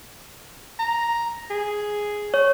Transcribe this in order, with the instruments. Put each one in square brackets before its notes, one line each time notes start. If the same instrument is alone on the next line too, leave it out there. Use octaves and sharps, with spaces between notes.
[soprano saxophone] A#5
G#4
[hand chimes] C#5